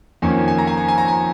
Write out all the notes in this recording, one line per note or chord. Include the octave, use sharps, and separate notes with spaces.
F2 D#3 A#3 C#4 G#5
G#5
A#5
G#5
A#5
G#5
A#5
G#5